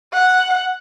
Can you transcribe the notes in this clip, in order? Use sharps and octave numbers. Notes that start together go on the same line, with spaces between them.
F#5